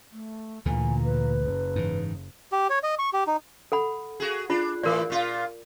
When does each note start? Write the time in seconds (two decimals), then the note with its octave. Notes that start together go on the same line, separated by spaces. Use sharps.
0.12 A3
0.65 D2 A#2 D3 E3 G#5
1.03 B4
1.43 F#1
1.76 G#2 E3
2.52 G4
2.70 C#5
2.83 D#5
2.99 C#6
3.13 G4
3.27 D#4
3.72 A4 F#5 B5
4.20 F#4 G#4
4.50 D4 F4
4.83 A2 E3 A#4 D5
5.10 A#2 F4